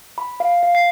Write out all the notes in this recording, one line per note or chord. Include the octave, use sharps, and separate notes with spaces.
B5
F5
F5
C7